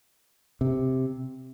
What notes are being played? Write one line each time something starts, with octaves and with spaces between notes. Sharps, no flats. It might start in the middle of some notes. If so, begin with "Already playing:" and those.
C3